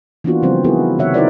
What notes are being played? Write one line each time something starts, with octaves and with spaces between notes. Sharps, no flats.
E3 A#3 B3 D4 F4 F#4
C#3 F3 G3 C4 C5
B3 D#4 E4 F#4 G#4 A#4
C3 D#3 E4 C#5 E5 F#5
D#4 E4 F#4 A#4 C5 D5